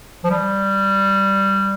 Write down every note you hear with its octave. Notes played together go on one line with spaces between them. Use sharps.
F3
G3